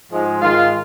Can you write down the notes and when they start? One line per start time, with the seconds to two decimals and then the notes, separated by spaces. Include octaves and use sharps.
0.11 G#2 F3 G#3
0.41 G#2 D#3 G#3 F4